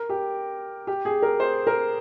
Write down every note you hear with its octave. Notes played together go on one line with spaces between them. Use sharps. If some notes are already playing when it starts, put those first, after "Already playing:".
Already playing: A#4
G4
G4
G#4
A#4
C5
A#4